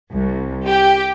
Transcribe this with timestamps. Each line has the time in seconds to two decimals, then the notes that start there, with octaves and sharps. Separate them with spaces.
0.12 C2
0.68 G4